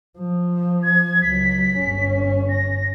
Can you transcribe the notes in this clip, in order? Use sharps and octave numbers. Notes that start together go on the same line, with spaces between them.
F3
G#6
C#2 F#3 B6
G1 C#4
A#6